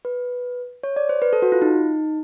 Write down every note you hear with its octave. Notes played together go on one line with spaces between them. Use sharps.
B4
C#5
D5
C5
B4
A4
F#4
F4
D#4